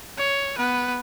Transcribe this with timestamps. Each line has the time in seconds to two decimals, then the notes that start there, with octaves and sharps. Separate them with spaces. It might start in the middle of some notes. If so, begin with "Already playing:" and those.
0.18 C#5
0.58 B3 B4